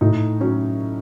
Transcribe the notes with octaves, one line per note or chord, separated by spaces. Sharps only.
A2 D#4
F#3 C#4